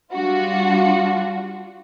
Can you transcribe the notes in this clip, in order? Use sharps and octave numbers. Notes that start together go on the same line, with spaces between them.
G3 D4 F4 F#4